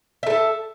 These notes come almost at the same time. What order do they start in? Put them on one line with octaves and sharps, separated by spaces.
E5 A4 A5